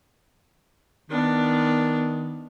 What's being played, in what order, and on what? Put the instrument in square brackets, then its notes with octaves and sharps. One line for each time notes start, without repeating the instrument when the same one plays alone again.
[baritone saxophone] D#3 [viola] B3 D4